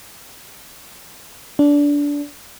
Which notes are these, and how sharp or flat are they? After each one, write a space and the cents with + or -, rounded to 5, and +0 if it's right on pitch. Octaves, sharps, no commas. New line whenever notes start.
D4 -20